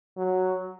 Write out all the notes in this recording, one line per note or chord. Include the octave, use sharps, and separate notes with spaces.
F#3